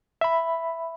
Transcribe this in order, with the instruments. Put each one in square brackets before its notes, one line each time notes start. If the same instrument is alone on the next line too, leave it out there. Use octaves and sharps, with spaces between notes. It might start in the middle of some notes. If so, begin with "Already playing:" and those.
[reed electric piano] E5 B5